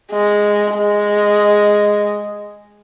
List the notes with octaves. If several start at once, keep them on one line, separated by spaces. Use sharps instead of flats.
G#3
G#3